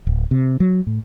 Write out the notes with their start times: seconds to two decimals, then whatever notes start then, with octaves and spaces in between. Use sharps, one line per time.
0.07 D1
0.31 C3
0.60 F#3
0.87 A2